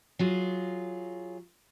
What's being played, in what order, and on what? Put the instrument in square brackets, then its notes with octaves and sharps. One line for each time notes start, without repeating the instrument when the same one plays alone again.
[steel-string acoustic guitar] F#3 F4 G#4